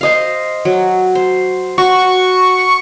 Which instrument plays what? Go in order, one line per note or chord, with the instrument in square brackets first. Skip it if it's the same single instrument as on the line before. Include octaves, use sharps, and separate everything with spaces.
[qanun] C5 D#5 F5
F#3
C5
[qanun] F#4 [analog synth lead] C#6